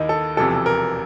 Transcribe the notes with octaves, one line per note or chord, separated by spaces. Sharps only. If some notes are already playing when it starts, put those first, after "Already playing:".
Already playing: D#2 D#3 D#4 E4
A4
E1 E2 C3 F3 A4
A#4